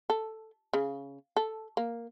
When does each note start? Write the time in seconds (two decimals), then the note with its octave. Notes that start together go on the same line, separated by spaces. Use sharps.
0.10 A4
0.73 C#3
1.36 A4
1.77 A#3